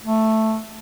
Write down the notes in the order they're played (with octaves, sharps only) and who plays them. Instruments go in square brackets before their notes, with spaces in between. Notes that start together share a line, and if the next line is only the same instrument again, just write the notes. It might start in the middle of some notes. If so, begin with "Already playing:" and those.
[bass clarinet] A3